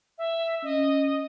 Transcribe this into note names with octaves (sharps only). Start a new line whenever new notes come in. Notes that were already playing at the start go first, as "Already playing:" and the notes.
E5
C#4 D#5